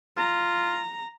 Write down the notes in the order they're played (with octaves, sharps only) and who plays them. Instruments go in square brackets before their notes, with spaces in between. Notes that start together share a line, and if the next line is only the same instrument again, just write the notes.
[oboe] F4 [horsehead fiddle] A#5